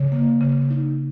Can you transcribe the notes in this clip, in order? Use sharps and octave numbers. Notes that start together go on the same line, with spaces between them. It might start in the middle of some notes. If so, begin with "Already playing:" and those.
Already playing: C#3
A#3
C#3
D#4